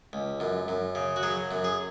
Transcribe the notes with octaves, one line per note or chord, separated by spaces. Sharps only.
C#2
F#2
F#2
C#3
F#4
F#3 G#4
F#2
G#4